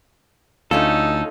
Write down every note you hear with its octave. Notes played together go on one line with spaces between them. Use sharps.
D2 A3 C#4 D#4 F4 A4